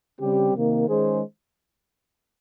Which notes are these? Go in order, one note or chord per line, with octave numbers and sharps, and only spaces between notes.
C#3 G3 C4 G4
C3 D#3 A#3
D#3 G#3 C#4 G#4 C5